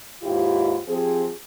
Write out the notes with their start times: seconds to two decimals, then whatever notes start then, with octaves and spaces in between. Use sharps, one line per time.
0.23 D#2 G#2 E4 F4 G4
0.88 F3 C4 G4 G#4